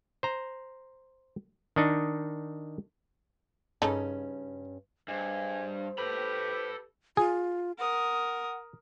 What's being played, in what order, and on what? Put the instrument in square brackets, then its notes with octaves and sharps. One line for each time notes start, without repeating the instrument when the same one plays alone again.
[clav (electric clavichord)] C5 A#5
D#3 D4 D#4
[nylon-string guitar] G2 C#4 [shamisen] C#3 D#4 A4
[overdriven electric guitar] G2 [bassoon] G#3 [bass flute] C5 [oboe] G#5
[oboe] G4 [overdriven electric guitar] A4 B5 [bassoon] B4
[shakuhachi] F4 [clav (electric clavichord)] G#4
[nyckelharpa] A#4 D#6 [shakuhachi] F#5